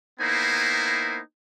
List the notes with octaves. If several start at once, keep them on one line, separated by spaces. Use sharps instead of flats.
A#3 B3 D#4 E4 C5 G#5